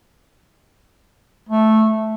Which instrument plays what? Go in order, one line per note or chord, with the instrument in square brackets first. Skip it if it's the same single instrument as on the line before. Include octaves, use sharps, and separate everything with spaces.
[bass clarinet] A3